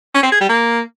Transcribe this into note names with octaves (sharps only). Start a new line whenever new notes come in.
C#4
C4
G#4
G3
A#3